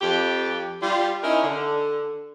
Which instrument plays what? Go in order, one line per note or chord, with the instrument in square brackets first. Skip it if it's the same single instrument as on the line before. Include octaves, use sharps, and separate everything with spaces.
[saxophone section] F2 G4
G3 F4
C#4 D#4 E4 A#4
D3